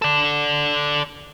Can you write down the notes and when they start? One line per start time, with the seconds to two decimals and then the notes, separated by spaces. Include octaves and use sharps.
0.02 A4 D5